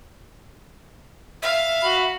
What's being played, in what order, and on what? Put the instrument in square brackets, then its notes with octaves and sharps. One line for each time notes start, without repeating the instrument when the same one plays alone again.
[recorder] E5 [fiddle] F5
[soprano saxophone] F#4 [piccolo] B5